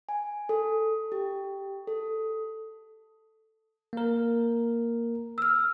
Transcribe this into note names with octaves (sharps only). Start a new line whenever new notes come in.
G#5
A4
G4
A4
A#3 A#4
E6 F6